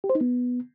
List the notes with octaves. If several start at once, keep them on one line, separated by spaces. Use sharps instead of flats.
G4
C5
D#4
B3